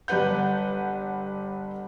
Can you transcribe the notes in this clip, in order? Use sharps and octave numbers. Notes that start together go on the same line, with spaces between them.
G1 G3 G4 B4 F#5 G6